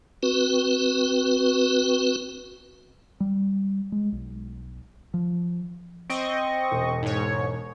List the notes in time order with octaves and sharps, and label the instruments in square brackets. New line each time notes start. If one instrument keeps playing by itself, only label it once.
[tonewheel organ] C4 F#4 B4
[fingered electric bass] G3
G#3
B1
F3
[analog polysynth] C4 D#5 C#6 [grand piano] D7
[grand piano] E1
[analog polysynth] G#2 C#5